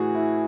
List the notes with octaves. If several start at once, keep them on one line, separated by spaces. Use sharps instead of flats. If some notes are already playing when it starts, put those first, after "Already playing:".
Already playing: A2 E3 F#4 G#4
E4